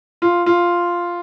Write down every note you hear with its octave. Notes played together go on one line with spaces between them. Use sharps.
F4
F4